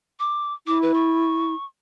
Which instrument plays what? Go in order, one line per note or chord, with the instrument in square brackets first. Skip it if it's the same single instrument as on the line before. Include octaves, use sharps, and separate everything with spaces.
[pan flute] D6
[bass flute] E4 [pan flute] D6
[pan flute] B4
C#6